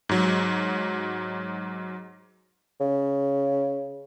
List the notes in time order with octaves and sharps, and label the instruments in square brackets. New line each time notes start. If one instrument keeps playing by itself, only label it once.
[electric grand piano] G#2 F#3
[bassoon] C#3